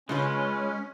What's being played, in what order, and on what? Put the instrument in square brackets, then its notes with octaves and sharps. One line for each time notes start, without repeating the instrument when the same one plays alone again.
[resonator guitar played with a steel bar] C#3 F4 B4 [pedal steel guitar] G#3 [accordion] C#4